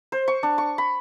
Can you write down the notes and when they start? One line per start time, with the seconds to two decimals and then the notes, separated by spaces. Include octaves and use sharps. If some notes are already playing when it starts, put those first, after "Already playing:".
0.12 C5
0.28 C#6
0.43 D4
0.58 C#6
0.78 B5